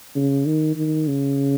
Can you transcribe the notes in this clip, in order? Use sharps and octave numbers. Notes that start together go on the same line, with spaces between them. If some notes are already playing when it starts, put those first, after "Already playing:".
C#3
D#3
D#3
C#3